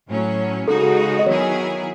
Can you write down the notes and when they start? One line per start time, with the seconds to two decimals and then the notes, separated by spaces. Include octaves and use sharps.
0.09 A2 F#3 C#4
0.68 C#3 G#3 D#4 F#4 A4
0.82 A4
1.19 D#5
1.26 D#3 F#3 B3 E4 G#4 C#5